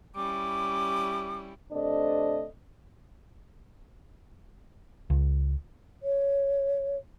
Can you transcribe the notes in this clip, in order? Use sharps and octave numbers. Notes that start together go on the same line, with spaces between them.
G3 C#4 E4 D6
C3 A3 C4 D4 D5 D#5
C#2
C#5